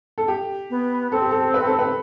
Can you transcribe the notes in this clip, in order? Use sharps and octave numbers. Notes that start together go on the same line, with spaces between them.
A4
G4
B3
C4 A4
G4
A4
B4
A4
B4